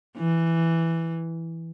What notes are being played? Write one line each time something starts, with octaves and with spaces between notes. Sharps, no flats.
E3